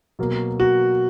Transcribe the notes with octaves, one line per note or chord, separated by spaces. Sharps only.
B2 F#3 A#3
F#4